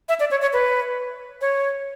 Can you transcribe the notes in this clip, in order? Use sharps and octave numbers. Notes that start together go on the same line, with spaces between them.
E5
D5
C#5
C#5
B4
C#5